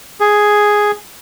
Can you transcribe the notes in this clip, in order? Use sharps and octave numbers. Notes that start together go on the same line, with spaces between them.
G#4